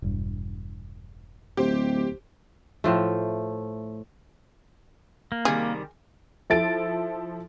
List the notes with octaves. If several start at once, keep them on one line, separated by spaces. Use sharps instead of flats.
E1 G2
D1 G4 C5
A2 F3 A3
A#3
C3 D#3 G3 G#4
F3 E4 A4 A6 D7